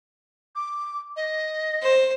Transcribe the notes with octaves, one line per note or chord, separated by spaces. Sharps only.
D6
D#5
C5